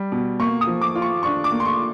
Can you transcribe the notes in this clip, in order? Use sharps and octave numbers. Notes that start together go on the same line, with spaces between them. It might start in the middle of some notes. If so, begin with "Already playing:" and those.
Already playing: G3
B2
A#3 C#6
D#6
F3
D6
F4
C#6
D4 C#6
D6
A#3
C6
C#6